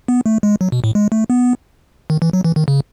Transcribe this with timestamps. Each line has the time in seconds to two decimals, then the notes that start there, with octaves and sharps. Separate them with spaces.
0.08 B3
0.26 A3
0.43 G#3
0.61 F#3
0.72 B2
0.84 A2
0.95 G#3
1.12 A3
1.30 B3
2.10 D#3
2.22 E3
2.33 F#3
2.44 E3
2.56 D#3
2.68 C#3